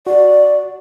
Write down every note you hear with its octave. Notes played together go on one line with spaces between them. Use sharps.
F#4 D5